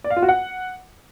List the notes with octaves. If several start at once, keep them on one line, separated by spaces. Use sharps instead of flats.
D5
F5
F4
F#4
F#5